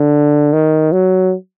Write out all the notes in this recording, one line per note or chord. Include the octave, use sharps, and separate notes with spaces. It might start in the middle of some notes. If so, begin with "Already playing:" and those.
Already playing: D3
D#3
F#3